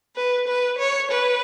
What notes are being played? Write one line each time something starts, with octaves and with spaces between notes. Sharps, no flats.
B4
B4
C#5
B4